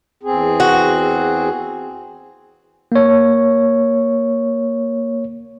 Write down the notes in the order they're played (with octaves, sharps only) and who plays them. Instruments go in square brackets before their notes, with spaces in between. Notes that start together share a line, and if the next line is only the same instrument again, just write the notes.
[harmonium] E2 C4 G#4
[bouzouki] F#4
[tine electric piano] A#3 C#5